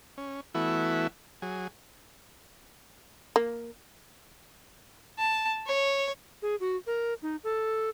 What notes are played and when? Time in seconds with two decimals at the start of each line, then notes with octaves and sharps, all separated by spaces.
0.18 C#4
0.55 E3 A3 B3 E4 F#4
1.42 F#3 G#4
3.36 A#3
5.18 A5
5.67 C#5
6.42 G#4
6.60 F#4
6.87 A#4
7.22 D#4
7.44 A4